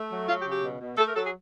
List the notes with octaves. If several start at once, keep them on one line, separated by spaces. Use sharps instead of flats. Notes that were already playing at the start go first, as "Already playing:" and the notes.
Already playing: A3
F#3
F#3 F4
G4
C#3
G4
B2
B2
A3 A4
A#4
F#3 A4
G#4